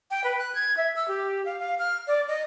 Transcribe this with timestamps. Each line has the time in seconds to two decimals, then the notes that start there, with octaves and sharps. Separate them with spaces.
0.11 G5
0.24 B4
0.38 F#6
0.55 G#6
0.77 E5
0.96 E6
1.08 G4
1.45 F5
1.60 F5
1.79 F6
2.07 D5
2.28 D#5